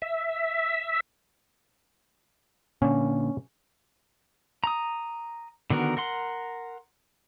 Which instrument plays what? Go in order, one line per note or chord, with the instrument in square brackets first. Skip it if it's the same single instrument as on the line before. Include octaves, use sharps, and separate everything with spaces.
[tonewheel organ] E5
[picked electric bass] A#2 D3 [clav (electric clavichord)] C#4
[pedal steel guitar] A#5 D#6
D3 D#3 B3 F#4 A#4
A#4 F#5 C6